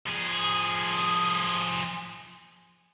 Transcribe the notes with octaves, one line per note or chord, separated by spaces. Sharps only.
F3 G#4